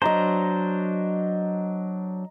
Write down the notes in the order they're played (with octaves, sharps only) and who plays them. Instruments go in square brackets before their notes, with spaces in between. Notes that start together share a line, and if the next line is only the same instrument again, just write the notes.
[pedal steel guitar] F#3 D4 C5 [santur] D#5 A#5